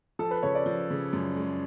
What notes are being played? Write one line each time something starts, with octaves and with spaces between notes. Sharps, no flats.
F3 A4
B4
C#3 C#5
D5
F3
C#3
F#2
G#3